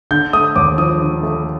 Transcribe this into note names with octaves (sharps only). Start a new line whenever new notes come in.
D3 G6
A3 D#6
D#2 D6
F3 D#6
D3
A3